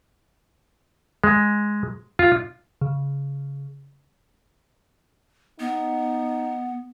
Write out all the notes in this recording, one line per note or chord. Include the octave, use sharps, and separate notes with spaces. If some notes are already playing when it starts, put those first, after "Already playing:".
G#3
F4
C#3
B3 D#4